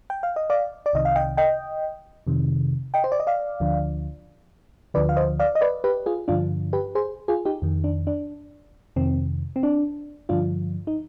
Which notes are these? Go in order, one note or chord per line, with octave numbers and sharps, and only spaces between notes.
G5
F5
D#5
D5 F5
D5
C2 C3 D#3 D#5
F5
D#5 G5
D#5 G5
F2 C3 D#3
D#5 G5
C5
D5
D#5
D5 F5
D2 D3 F3
D2 D3 F3 B4 D5
F5
C5 D#5
D5 F5
D#5
B4 D5
G4 B4
F4 G#4
G2 D3 F3 D4 F4
G4 B4
G#4 C5
F4 G#4
D#4 G4
F2 D#3
D4
D4
F2 C3 D#3 C4
C4
D4
G2 D3 F3 D4 F4
D#4